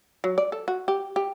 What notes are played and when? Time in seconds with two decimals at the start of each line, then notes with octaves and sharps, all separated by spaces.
0.24 F#3
0.38 D5
0.52 A4
0.68 F#4
0.88 G4
1.16 G4